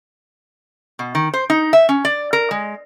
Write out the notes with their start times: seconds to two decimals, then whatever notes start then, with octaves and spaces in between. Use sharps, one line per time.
0.99 B2
1.15 D#3
1.34 C5
1.50 D#4
1.73 E5
1.89 C#4
2.05 D5
2.33 A#4
2.51 G#3